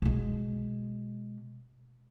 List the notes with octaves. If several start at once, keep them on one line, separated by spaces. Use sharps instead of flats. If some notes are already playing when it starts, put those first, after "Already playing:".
B2 G#3